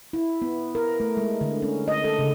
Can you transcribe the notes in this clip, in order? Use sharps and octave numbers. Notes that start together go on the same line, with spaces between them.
E4
B3
A#4
A3
G#3
D3
C#4
D#5
A4
C#3